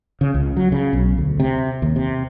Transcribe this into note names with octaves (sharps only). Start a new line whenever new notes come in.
C#3
C#2
F#3
C#3
B1
D2
C3
D#2
C3